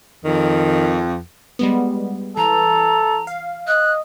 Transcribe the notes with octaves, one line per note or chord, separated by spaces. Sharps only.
F2 D#3
G3 G#3 B3
E3 A4 A#5
F5
D#5 F#6